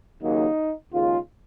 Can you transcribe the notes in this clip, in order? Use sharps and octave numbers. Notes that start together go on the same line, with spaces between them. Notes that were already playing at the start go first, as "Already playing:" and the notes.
D#2 C#3 F#3 A#3 D#4
D#2 C#3 G#3 F4